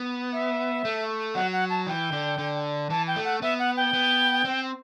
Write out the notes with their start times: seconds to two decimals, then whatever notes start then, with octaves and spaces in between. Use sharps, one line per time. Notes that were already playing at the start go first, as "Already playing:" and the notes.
Already playing: B3
0.33 E5
0.85 A3
1.35 F#3 F#5
1.53 F#5
1.70 A5
1.87 E3 G5
2.12 D3
2.38 D3
2.90 E3 A5
3.07 G5
3.16 A3
3.25 F#5
3.42 B3 E5
3.59 F#5
3.77 G5
3.93 B3
4.45 C4